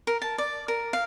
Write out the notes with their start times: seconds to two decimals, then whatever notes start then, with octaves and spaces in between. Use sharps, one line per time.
0.07 A#4
0.22 A5
0.38 D5
0.68 A#4
0.93 F5